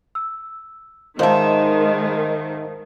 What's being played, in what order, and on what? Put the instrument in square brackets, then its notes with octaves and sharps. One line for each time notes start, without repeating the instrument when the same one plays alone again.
[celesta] E6
[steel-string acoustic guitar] G#2 E5 [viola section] D#3 [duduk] G#3 [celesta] C5 F5 A5